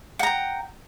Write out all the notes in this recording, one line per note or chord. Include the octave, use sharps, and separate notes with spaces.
F#5 G5 A#5